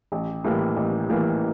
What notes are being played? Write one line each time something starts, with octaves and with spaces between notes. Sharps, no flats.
A1
A2 E3 G3 A#3
A1
A2 E3 G3 A#3